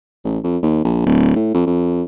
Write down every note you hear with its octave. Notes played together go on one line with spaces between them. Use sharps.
A1
F2
D#2
A#1
D1
A2
F2
F2